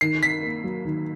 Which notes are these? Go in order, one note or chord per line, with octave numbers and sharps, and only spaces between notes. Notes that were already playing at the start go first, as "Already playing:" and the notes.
D#3 C7
D#3 B6
A#3
F#3
D#3